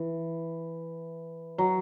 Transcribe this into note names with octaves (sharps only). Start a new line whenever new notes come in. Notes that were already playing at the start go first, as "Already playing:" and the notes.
Already playing: E3
F#3